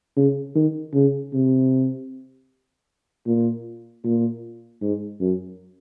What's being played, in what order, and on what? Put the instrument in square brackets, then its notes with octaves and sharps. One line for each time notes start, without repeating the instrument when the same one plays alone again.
[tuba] C#3
D#3
C#3
C3
A#2
A#2
G#2
F#2